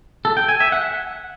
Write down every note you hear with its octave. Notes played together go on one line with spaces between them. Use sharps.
A4
G5
G#5
E5
F#5